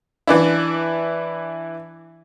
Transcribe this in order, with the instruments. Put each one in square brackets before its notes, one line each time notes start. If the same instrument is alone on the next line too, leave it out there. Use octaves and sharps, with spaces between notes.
[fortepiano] E3 D4 E4